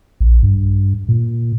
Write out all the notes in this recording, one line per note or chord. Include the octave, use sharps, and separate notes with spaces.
A#1
G2
A#2